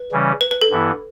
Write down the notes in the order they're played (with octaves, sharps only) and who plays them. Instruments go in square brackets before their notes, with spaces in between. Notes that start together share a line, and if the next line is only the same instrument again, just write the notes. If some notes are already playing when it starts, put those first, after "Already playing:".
Already playing: [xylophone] B4
[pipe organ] C#3 E3 G3 C#4
[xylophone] B4
B4
A4
[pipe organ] G2 E3 B3 E4